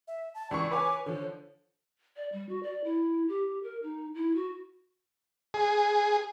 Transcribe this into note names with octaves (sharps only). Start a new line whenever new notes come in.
E5
A5
C#2 E3 D5 C#6
B4 C#5 G#5 D6
D3 F3 C#5
D5
G3
F#4
D5
E4
G4
A#4
D#4
E4
F#4
G#4